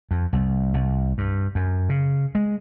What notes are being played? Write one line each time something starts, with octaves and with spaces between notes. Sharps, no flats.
F2
C2
C2
G2
F#2
C#3
G#3